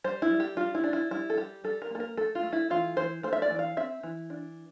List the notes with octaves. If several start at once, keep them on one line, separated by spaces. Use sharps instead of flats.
G3 C5
E4
G3
G4
G3 F4
E4
D4
E4
G3 E4
A4
G3 G4
G3 A4
A#4
A#3 A4
A#4
A3 A4
F4
A3
E4
E3 F4
E3 C5
A3 C5
E5
D5
E3
F5
C4 E5
E3
D4